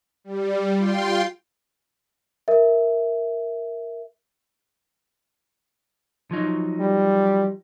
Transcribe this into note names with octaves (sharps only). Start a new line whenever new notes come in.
G3
F4 G5 C6
A#4 E5
F3 F#3 D#4
G3